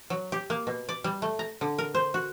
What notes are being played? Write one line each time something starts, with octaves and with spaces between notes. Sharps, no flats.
F#3
G4
A#3
B2
D5
G3
A3
A#5
D3
A#4
C5
F#4